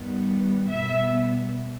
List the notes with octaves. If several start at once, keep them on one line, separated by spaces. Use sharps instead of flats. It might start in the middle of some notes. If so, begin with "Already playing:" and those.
Already playing: G2 D#3 G3 B3
B2 G3 B3 E5